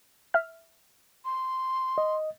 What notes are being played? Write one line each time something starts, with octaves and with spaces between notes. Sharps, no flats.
E5 F6
C6
D#5